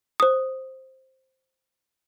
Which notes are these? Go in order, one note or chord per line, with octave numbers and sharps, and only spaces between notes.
C5 D#6